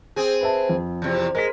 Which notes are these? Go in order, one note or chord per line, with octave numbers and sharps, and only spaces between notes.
C4 G#4
B4 E5 A5
F2
E2 C3
G#3 A#4 B6